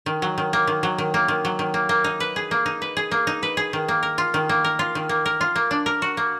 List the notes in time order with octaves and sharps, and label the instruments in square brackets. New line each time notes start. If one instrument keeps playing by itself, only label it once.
[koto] D#3
F#3
D#3
A#3
D#3
F#3
D#3
A#3
D#3
F#3
D#3
A#3
A#3
D#4
B4
G#4
A#3
D#4
B4
G#4
A#3
D#4
B4
G#4
D#3
A#3
A#4
F4
D#3
A#3
A#4
F4
D#3
A#3
A#4
F4
A#3
D4
A#4
F#4
A#3